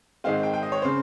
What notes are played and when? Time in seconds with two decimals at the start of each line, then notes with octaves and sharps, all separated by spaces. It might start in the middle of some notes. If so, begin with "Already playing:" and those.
0.24 G#2 D#3 G#3 C4 F5
0.43 G5
0.53 G5
0.63 D#5
0.72 C#5
0.82 C#3 C5